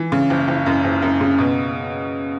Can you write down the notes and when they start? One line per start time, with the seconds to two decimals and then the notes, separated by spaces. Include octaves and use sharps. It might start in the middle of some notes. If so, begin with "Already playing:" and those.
Already playing: E3
0.12 C#3
0.30 F#1
0.48 F#1
0.66 F#2
0.84 F#1
1.02 F#2
1.21 C#3
1.38 B2